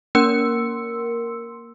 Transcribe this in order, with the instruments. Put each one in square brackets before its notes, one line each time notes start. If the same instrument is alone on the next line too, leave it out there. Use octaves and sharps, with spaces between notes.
[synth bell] A#3 A#4 C6 E6 C#7